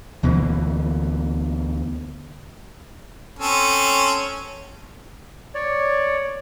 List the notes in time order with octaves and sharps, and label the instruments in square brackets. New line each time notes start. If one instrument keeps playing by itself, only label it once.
[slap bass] D2 B2 E3 A#3
[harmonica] C4 C#4 A4
[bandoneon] C#5 D5